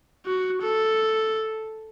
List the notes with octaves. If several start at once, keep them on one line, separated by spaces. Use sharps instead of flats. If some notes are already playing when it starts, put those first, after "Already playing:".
F#4
A4